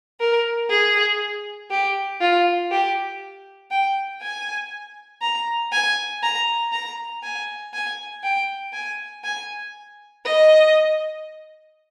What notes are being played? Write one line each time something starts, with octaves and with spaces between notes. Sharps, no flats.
A#4
G#4
G4
F4
G4
G5
G#5
A#5
G#5
A#5
A#5
G#5
G#5
G5
G#5
G#5
D#5